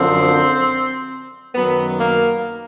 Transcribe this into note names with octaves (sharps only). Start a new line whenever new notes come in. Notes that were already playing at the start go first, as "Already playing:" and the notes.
Already playing: F#2 D3 F3 C4
F#2 D#3 F#3 B3
A#3